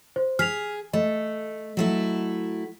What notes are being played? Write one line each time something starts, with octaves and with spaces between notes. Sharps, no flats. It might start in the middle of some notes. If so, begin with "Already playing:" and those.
C5
G#4 F6 B6 F7
A3 D#5
F#3 A3 E4